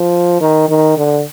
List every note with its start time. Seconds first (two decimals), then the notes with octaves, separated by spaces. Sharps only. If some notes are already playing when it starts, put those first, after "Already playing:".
Already playing: F3
0.41 D#3
0.69 D#3
0.98 D3